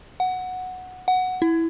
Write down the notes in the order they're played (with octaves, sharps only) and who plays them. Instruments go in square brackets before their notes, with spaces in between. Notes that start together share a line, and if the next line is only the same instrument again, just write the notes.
[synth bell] F#5
F#5
E4